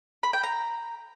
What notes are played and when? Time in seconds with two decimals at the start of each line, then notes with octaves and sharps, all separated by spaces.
0.23 B5
0.33 G5
0.43 A#5